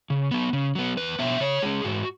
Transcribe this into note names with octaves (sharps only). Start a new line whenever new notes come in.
C#3
F#3 B3
C#3
F#3 B3
E2 B4
B2 F#3 B3 E5
C#3 C#5
G#3 C#4 G#4
G#2 F#4